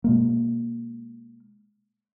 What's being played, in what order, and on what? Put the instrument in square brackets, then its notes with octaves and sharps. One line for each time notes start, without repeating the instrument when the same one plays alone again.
[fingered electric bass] B2 G#3 A#3